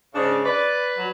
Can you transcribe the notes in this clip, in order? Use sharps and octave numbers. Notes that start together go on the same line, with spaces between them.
G#2 C#3 D4
B4 D5
F#3